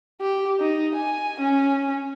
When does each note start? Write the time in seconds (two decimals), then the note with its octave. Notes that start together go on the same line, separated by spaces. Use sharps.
0.20 G4
0.60 D#4
0.95 G#5
1.39 C#4